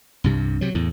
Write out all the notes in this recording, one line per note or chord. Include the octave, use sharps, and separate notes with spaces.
C2 G2 C3
C3 F#3
E2 A2